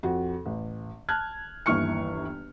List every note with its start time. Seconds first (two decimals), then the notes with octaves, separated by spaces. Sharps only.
0.03 F2 F#4
0.46 A1
1.09 A5 F6 F#6 G#6
1.66 G1 D#2 E3 C#6 F6 C#7